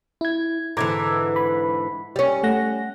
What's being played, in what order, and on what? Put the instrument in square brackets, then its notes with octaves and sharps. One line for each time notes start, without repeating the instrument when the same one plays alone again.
[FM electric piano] E4 G#6
[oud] G#2 D3 E3 [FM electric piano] A#5 D6 G#6
[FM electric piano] B5
[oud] G3 C#4
[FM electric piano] A3 F#5 A#6